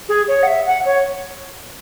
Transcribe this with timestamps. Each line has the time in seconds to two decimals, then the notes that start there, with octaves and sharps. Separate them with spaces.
0.08 G#4
0.28 C#5
0.42 F#5
0.47 E5
0.66 F#5
0.85 C#5